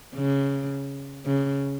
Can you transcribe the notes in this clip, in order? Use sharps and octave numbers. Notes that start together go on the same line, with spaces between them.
C#3
C#3